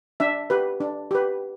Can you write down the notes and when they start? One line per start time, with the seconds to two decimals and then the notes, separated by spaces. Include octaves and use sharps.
0.20 D4 E5
0.50 G4 B4
0.80 D4
1.11 G4 B4